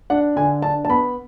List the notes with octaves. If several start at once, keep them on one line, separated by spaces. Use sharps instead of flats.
D4 F#5
D3 G#5
D4 A5
A5
B3 B5